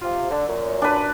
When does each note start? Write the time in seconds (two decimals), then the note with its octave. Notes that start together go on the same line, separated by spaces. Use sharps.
0.02 C3 F4
0.31 D3
0.48 F#2 A#2
0.82 D4 B4